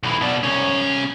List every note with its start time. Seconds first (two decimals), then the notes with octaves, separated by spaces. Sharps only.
0.03 B1 E3
0.21 B2 D4
0.43 C2 C#4